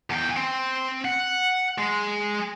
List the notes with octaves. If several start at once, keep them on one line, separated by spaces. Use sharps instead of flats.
E2 G5
C4
F#5
G#3